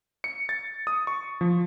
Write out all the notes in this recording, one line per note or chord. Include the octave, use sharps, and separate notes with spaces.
C#7
A6
D#6
C#6
F3